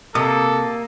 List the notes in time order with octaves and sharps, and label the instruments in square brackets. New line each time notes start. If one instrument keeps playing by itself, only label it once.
[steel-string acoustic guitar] C3 [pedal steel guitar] A#3 D#6 [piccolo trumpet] A4